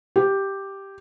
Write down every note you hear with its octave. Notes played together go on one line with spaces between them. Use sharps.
G4